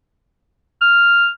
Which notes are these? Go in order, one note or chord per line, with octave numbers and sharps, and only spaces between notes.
F6